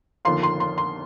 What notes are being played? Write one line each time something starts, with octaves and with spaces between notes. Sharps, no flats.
G1 F2 D#3 A#3 F4 C6
C6
C6
C6